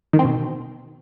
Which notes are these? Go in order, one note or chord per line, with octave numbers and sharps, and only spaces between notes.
D#3
C4
B2